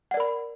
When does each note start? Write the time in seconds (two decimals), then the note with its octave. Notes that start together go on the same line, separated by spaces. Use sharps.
0.11 F#5
0.14 D5
0.17 A#4
0.20 B5